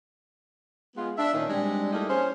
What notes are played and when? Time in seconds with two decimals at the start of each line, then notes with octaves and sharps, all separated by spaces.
0.96 G#3 B3 F4
1.18 D4 E5
1.34 A#2 D#3 C#4 D#4
1.49 G3 G#3 C4 D4
1.92 G3 A3 A#3 D#4 E4 G#4
2.10 C#4 C5